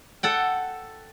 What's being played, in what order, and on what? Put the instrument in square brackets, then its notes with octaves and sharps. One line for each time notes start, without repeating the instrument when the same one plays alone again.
[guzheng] A4 F#5 G5